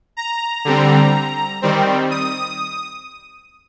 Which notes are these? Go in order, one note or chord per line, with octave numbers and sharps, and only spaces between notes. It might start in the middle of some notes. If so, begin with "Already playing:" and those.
A#5
D3 G3 C4
D#3 G3 C4
D#6